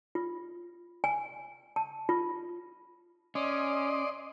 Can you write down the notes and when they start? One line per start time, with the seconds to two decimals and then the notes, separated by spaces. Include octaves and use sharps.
0.15 F4
1.04 G#5
1.76 A5
2.09 F4
3.35 C#4 D5 D#5 C6